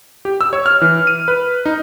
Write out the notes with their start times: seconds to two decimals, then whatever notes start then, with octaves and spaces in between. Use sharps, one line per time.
0.25 G4
0.41 E6
0.53 C#5
0.66 F6
0.82 E3
1.07 D#7
1.28 B4
1.66 D#4